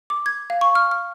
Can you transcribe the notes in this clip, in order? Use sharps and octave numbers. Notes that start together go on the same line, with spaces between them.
D6
G#6
F5
C#6
F6
F6